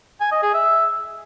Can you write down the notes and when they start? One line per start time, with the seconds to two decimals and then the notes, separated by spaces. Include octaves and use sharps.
0.21 G#5
0.32 D#5
0.43 G#4
0.54 E5